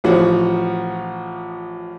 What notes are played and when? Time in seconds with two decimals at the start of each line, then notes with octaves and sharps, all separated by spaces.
0.04 A1 F3 F#4 F#5